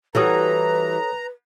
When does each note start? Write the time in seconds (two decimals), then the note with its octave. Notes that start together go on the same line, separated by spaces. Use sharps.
0.15 E3 G3 F#4 A4 B4 C#5 A#5 D#6